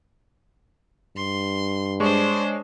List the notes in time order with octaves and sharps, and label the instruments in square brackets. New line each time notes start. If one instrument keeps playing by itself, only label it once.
[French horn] G2 [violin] C6
[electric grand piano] G#3 C#5 C#6 [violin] D4 C5